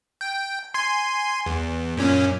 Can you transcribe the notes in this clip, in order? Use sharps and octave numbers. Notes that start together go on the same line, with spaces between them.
G5
G#5 C6
E2
F#2 A#2 C#4